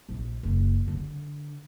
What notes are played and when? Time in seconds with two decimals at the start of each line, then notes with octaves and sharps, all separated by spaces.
0.09 A#1
0.43 F#1
0.87 D3